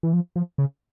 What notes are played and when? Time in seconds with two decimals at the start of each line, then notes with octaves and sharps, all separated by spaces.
0.03 E3
0.13 F3
0.36 F3
0.58 C#3